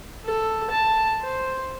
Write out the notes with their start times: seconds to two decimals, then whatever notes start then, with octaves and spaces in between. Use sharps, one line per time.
0.25 A4
0.70 A5
1.21 C5